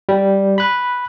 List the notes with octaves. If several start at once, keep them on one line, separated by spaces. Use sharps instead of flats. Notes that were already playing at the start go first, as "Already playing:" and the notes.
G3
B5 F#6